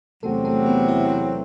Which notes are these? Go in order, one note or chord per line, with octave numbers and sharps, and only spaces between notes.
E2 C3 F#3 A3 C4 F#4 A4
A3 A4
B3 B4
E4 E5